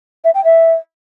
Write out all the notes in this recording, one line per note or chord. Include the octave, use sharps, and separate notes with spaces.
E5
G5
E5